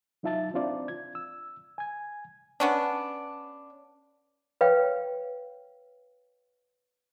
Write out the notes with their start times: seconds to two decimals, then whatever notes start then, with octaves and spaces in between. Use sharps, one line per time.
0.23 F#3 D#4 F4 E5 A5 A6
0.54 C4 D4 F4 D5
0.88 G#6
1.15 E6
1.78 G#5 G#6
2.60 B3 C#4 D4
4.61 B4 C#5 F5 G5